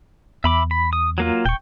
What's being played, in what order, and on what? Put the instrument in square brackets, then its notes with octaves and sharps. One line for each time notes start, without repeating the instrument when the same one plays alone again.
[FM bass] E2 [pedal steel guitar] E5 B5 D6
[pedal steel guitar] B5
D#6
F#3 A#3 F4
[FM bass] D#1 [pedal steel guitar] G5 C#6